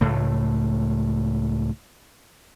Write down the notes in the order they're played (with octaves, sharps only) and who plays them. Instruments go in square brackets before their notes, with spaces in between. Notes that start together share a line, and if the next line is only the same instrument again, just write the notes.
[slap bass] C#2 A2 A3